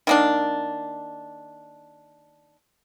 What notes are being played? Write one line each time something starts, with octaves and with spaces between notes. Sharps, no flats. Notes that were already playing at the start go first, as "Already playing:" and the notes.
D#3 A#3 D4